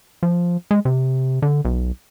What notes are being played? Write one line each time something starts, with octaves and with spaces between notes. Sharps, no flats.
F3
G#3
C3
D3
B1